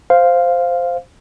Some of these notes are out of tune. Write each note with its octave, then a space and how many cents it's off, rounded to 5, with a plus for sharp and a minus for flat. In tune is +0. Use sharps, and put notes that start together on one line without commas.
C5 -5 F5 +0